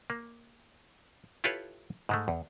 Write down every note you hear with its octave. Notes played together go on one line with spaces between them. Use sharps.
A#3
E4 F4 G4 A4 B4 C#5
G#2 G#3 A3
E2